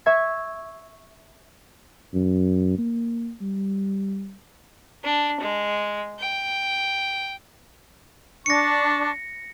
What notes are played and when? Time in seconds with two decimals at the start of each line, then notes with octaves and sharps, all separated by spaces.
0.06 E5 C#6 G#6
2.14 F#2
2.78 A#3
3.41 G3
5.04 D4
5.40 G#3
6.19 G5
8.46 D4 C#6 A#6 C#7